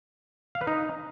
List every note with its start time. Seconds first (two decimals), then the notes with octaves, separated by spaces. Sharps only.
0.55 F5
0.61 B4
0.67 D#4